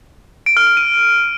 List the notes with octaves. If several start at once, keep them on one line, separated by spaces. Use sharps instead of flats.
D7
F6
F6
D#7